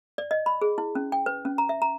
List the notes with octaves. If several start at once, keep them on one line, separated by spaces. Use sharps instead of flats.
D5
D#5
B5
G#4
E4
C#4
G5
B4
C#4
A#5
E5
A#5